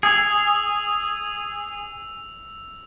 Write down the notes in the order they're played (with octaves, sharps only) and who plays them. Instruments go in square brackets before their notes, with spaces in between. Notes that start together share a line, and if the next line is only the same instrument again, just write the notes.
[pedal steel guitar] G#4 [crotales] E6 F7